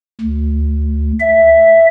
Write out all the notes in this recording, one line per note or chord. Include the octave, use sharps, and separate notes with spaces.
D2
E5